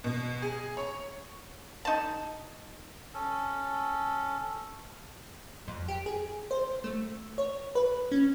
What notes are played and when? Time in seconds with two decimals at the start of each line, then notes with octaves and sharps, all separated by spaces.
0.04 B2
0.42 G#4
0.77 C#5
1.85 D#4 A5
3.14 C#4 A4
5.68 F2
5.88 G4
6.06 G#4
6.51 C5
6.84 A3
7.38 C#5
7.75 B4
8.12 C#4